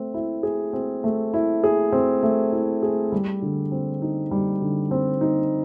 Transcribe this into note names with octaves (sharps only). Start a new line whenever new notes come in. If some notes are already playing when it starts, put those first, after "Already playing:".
Already playing: A3 C4
E4
G#4
C4
A3
E4
G#4
C4
A3
E4
G#4
G3
D3
C4
D#4
G3
D3
C4
D#4